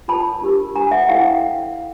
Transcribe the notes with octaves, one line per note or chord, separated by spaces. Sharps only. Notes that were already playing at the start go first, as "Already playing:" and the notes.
F4 A#4 C#5 A5 B5
D4 G4 A#4
D4 G4 A#4 G#5 A#5
E5 F#5
E4 A4 C5 F5 G5